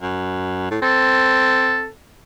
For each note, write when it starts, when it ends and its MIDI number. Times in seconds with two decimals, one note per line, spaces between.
0.02 0.68 42
0.71 0.78 45
0.82 1.89 60
0.82 1.88 69